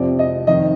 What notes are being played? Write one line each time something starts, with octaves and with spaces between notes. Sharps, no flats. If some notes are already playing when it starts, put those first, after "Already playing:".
Already playing: F2 C3 F3 D5
D#5
F2 D#3 D#5